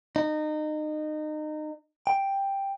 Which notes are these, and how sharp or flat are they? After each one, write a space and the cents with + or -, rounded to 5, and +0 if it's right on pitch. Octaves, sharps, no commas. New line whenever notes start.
D#4 -25
G5 +5